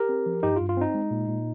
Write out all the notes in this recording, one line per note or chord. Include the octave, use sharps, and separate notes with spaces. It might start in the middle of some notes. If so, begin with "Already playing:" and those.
Already playing: G4 A#4
C4
F3
G2 D#4 G4
F4
G2
F4
C4 D#4
G#3
A#2
A#2